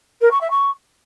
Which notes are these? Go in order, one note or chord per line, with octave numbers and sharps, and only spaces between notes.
A#4
C#6
E5
C#6